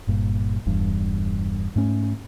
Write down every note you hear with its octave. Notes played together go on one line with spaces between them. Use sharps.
G1 G2 A#2
E1 E2 G2
G#2 A3 C#4